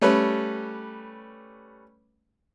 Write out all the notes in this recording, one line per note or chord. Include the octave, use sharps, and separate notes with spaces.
G3 A3 C#4 B4